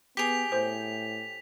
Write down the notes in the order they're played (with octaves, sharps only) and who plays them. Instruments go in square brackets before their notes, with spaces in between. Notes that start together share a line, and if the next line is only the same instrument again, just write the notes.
[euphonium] B3 [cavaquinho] G4 G#4 [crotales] B6 F7
[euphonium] A2 [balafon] C5